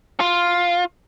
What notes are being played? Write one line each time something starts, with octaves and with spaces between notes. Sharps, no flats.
F4